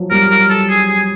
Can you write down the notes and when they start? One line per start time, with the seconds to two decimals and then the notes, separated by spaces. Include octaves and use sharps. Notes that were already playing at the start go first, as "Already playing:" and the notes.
Already playing: F3 F#3
0.11 G3 A#4
0.30 A#4
0.50 A4
0.69 G#4
0.88 G#4